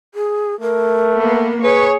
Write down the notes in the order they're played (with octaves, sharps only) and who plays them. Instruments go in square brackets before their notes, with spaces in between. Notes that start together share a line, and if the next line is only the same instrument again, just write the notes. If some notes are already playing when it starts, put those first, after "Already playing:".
[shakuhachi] G#4
[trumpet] A3 [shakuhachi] A#4
[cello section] A#3 B3
[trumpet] G#4 [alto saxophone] B4 [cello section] C#5